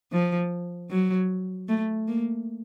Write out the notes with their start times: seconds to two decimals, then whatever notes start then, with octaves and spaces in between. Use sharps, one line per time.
0.12 F3
0.90 F#3
1.68 A3
2.08 A#3